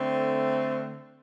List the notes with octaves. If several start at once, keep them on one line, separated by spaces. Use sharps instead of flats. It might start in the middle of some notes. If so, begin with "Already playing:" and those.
Already playing: D3 A3 C4